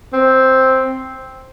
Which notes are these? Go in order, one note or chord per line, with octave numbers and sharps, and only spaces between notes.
C4